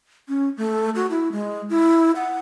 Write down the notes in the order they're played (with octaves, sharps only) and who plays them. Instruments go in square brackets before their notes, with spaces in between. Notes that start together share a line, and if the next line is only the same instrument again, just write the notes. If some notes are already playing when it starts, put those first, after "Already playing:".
[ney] C#4
A3
F#4
E4
G#3
E4
F#5